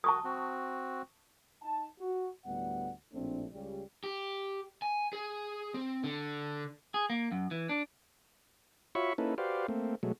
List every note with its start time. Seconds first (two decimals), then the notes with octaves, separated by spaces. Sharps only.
0.04 F#4 A5 C#6 D#6
0.24 C4 F#4
1.62 D#4 A5
1.99 F#4
2.45 D2 A2 G3 B3 F#5
3.13 A#1 A2 A3 C4 D4
3.52 C#2 C#3 G3
4.04 G4
4.82 G#5
5.13 G#4
5.74 C4
6.04 D3
6.94 G#4
7.10 A#3
7.32 F#2
7.51 E3
7.69 D4
8.95 F4 F#4 C#5 E5 B5 C#6
9.18 A#3 C#4 D#4 E4 A4 B4
9.38 F#4 G4 B4 C5 D5 F5
9.68 A3 A#3 C4
10.03 B2 F#3 G#3 A3